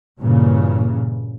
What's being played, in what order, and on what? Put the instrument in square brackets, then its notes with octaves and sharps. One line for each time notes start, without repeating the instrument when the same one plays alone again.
[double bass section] G2 A#2 C#3 E3